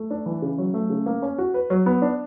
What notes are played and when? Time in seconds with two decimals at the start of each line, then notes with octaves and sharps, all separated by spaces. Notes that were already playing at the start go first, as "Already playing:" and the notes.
Already playing: A3
0.10 D4
0.26 E3
0.42 C#3
0.58 F#3
0.74 A3
0.90 C#3
1.06 A#3
1.22 C#4
1.38 F#4
1.54 B4
1.70 F#3
1.86 B3
2.02 D4